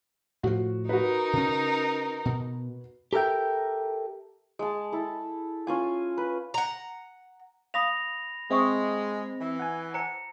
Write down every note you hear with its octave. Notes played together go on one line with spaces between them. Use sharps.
A2 F3 F#4
D#4 F#4 A#4 B4
C#3 C#4
B2
G4 A4 A#4 E5 G5
G#3 A5
E4 A4
C#4 F4 G#5
B4
F#5 A#5
F5 B5 D#6 A#6 F7
G#3 C4 E5 C#6 D#6
E3
F#5 G#5
C5 A5 A#5 C#7